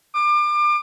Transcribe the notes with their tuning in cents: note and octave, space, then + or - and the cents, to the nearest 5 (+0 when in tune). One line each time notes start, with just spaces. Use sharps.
D6 +30